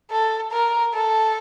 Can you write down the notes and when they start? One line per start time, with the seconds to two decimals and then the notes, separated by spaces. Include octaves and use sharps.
0.12 A4
0.52 A#4
0.94 A4